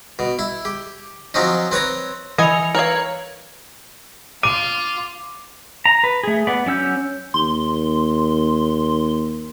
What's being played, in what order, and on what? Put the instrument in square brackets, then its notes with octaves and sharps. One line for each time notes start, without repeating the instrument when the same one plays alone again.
[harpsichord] B2
E4
G4
F3 F#3 C4 C#4 D#4
C4 B4 C#5 A#5
[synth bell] E3 C#7 F7 [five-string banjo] D#5 G#5
[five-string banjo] A#4 F5 [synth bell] B4 C#5 G#6
[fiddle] F4 [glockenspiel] D6 [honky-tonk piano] D#7
[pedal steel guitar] A#5
B4
A3 G#4
B3 D5
F#3 C#4 E6 G6
[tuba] D#2 [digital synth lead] C6